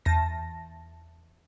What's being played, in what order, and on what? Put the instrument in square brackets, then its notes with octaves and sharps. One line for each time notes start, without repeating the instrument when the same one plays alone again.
[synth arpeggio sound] E2 A5 A#6